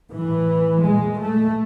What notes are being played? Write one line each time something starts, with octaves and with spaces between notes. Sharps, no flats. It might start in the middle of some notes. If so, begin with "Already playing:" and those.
A2 E3
A#2 G#3
A3